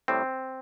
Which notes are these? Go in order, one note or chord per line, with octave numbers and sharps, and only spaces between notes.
A2 G3 C4